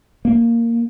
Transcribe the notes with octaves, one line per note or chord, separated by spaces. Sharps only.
A#3